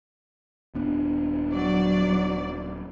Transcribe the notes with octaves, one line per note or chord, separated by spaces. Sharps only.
D#1 B3 D4
F#3 D5